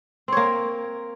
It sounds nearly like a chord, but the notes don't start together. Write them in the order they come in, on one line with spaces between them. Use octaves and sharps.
C4 C#5 A#3